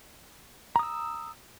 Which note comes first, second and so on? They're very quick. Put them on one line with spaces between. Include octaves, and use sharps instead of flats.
A#5 D#6 E6